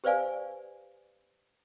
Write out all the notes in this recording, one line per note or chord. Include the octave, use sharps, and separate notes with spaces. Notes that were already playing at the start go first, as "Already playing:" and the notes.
G4 B4 C5 D5 F5 G#5